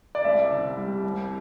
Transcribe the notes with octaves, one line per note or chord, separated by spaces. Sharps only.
D5
C2 E5
C3
G3
C2